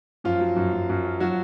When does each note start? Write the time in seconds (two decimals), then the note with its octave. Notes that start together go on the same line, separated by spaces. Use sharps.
0.24 F#2 F3 F4
0.41 F#3
0.56 F#2
0.73 F#2
0.89 F#2
1.05 F#3
1.20 F3 F#3 F#4